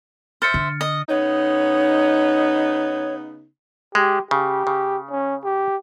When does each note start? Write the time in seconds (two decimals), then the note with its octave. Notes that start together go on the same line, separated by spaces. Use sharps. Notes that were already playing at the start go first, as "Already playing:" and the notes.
0.42 C5 E5 F6 A6 C#7
0.54 D3
0.81 D#5
1.09 C#3 B3 D#4 C#5
3.95 G#3 G4
4.31 C#3 G4
4.67 C#3
5.11 C#4
5.44 G4